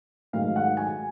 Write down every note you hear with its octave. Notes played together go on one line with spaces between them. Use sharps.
G#2 D#3 F#3 A3 F5
F#5
G#5